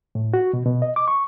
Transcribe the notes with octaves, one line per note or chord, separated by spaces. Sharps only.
A2
F#4
B2
B2
D#5
D6
C#6